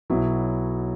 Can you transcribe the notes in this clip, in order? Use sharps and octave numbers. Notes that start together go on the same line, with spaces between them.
B1 B2 F#3 B3 E4